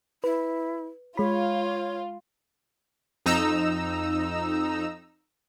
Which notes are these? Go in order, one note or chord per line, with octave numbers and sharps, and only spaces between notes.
E4 B4
G#3 F4 C#5 B5
F2 D#4 A#5 E6